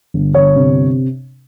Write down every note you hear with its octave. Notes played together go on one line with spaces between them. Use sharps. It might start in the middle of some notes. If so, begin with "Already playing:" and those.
G1
G1 C#5
C3